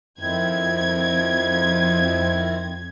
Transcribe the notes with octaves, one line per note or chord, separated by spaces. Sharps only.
F2 D#3 C4 E4 G#6